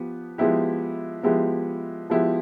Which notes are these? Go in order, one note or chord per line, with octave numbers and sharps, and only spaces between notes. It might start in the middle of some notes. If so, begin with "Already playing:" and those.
Already playing: F3 B3 G4
F3 G#3 B3 E4 G4
F3 G#3 B3 E4 G4
F3 G#3 B3 E4 G4